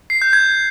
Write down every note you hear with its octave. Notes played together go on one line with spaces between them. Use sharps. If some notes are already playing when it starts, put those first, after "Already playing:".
C7
G6
G#6